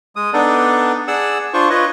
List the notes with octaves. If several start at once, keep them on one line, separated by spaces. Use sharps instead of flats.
G#3 D#6
B3 D4 D#4 A4 D5
G#4 D5 F#5 E6
D4 F4 C5 C#6
F4 B4 C#5 D#5